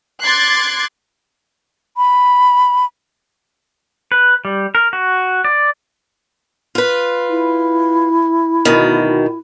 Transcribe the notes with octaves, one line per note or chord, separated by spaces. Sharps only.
C6 D6 F#6 G#6 A6 C7
B5
B4
G3
A#4
F#4
D5
F4 B4
E4
D2 B2 D#3